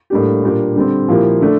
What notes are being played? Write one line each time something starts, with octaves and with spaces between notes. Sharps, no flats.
A2 G3 A#3 D4 G4
A#2 G3 A#3 D4 G4
D3 G3 C4
A#2 F3 A#3 E4 G4
D3 A3 D4